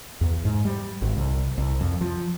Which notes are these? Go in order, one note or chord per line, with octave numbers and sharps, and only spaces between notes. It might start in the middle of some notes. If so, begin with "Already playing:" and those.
E2
G#2
G3
G#1
C2
C2
F2
F3